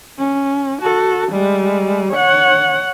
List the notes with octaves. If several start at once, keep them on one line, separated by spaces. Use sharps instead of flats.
C#4
F#4 A4
G3 G#3
C#5 F#5